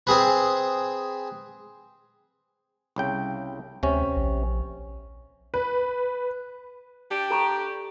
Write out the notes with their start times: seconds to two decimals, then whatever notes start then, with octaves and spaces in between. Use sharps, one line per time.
0.07 C4 G#4 B4
2.96 C2 C#3 G5
3.83 D2 C3 C#4
4.16 A#1
5.54 B4
7.12 D4 G4
7.31 A4 A#5 C#6